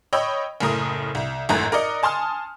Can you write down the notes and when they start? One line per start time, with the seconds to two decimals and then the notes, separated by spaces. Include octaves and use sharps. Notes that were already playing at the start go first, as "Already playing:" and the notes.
0.13 C#5 D#5 G5 B5 E6
0.60 F#1 A2 A#4 D#6
1.15 C2
1.49 G#1 F#2 A2 A#5 F#6
1.72 A#4 D5 D#5 C#7
2.03 G#5 A5 C6 D#6 F6